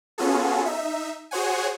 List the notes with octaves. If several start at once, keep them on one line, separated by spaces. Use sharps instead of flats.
B3 C#4 F4 F#4 G#4 A4
D#4 E5
F#4 G#4 C5 C#5 F#5 G#5